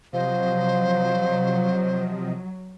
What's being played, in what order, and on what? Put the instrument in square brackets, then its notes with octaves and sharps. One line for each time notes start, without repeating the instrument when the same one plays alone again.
[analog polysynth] C3 F3 D#5 [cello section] F#3 [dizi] C5 [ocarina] F5